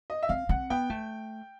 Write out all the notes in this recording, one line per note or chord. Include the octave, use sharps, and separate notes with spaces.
D#5
E5
C4 F5
C4 F#5
B3 G5
A3